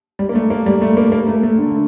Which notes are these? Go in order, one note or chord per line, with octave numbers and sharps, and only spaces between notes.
G3
A#3
A3
A#3
G3
A3
A#3
A#3
A3
A3
D3